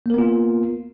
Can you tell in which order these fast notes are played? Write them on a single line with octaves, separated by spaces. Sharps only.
A#3 A#4 B3 F4